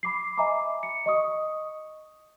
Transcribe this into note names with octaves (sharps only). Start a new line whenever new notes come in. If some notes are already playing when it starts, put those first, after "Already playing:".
B5 D6 C7
D#5 E5 G#5 A#5 B5 D6
C#7
D#5 C#6 D#6